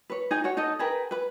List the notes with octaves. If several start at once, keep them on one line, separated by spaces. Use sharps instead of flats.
B4 C#5
D#4 G#4 D#5 G#5
F#4 C#5
D#4 A4 D#5
G#4 A#4 B4 G5
B4 B5